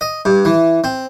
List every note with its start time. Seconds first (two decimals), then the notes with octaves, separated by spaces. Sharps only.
0.01 D#5
0.25 G2
0.45 E3
0.84 C4